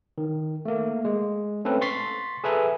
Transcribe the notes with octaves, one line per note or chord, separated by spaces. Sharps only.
D#3
A3 A#3
G#3
A3 C4 C#4 A4 B4
C6 C#6 A6 B6 C7
G#4 A4 B4 E5 G#5 A#5